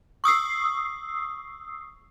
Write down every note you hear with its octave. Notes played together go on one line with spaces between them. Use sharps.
C#6 D#6 E6 C7